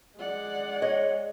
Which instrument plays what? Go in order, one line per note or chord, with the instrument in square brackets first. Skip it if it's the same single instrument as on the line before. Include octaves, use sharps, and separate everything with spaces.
[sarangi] G#3 [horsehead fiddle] D5 F#5
[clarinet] C#5 [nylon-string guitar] D#5